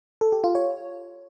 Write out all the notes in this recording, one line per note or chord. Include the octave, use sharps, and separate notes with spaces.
A4
G4
F4
C#5